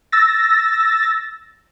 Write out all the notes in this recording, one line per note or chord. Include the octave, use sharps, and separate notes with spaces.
E6 A6 A#6